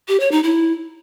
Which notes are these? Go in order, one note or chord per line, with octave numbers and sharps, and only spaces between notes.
G4
C#5
D#4
E4